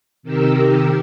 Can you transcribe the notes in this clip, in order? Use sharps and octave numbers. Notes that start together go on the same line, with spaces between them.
C3 D#3 G4 A#4 E6